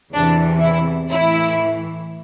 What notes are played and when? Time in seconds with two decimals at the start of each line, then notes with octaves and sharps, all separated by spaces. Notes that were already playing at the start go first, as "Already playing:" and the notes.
0.13 E2 C3 E3 D4
0.61 E4
1.10 A2 E3 E4